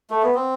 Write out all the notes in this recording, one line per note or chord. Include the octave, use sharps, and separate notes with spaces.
A3
B3
C4